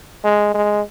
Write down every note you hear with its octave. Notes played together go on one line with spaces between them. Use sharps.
G#3
G#3